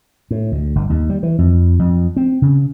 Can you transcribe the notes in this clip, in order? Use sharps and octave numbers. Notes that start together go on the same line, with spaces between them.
A2
D2
G1
D#2
G3
E3
F2
F2
C4
C#3